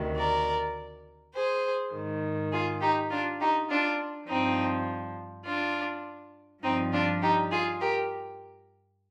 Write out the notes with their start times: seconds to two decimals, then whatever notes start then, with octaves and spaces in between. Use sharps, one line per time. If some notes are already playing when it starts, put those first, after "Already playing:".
Already playing: D2 C3 D#3
0.17 A#4 D5
1.34 G#4 C5
1.93 G#2 D#3
2.52 F4 G#4
2.81 D#4 G4
3.11 D4 F4
3.40 D#4 G4
3.69 D4 F4
4.28 G2 F3 C4 D#4
5.45 D4 F4
6.63 G2 F3 C4 D#4
6.92 D4 F4
7.22 D#4 G4
7.51 F4 G#4
7.80 G4 A#4